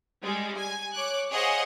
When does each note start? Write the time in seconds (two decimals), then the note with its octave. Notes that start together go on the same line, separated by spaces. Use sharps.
0.21 G3 G#3
0.57 G#5
0.95 C#5 D6 F#6
1.31 G#4 C5 C#5 D#5 F5 F#5